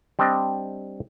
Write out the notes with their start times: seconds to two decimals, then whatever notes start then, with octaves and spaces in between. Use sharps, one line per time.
0.19 G3 C4 D4 D#5 G5